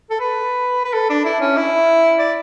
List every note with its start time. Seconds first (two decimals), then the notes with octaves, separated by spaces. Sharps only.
0.10 A4
0.20 B4
0.84 B4
0.93 A4
1.10 D4
1.25 E4
1.40 C#4
1.57 E4
2.19 D5